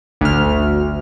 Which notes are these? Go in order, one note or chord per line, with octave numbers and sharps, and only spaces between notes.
G1 D2 F6